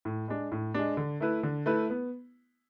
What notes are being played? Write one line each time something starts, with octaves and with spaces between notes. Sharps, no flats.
A2
G#3 D4
A2
G#3 D4
D3
A3 E4 B4
D3
A3 E4 B4
B3